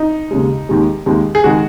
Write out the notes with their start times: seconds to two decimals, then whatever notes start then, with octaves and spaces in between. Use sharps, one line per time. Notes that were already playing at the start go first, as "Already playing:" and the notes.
Already playing: D#4
0.31 D#2 C#3 G#3
0.69 D#2 D#3 G#3
1.06 D#2 D#3 G#3
1.35 G#4
1.44 D#3 G#3 F#4